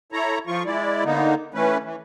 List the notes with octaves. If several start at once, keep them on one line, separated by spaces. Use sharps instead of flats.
E4 A4 C#5 A#5
F3 F4 C#6
G#3 E4 D5
D3 A#3 B3 D#4
E3 A3 C#4 B4
E3